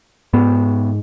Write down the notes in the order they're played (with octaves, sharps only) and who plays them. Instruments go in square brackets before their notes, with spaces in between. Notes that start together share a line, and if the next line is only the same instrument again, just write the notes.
[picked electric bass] G#2 B3